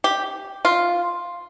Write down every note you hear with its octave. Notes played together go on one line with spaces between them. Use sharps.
G4
F4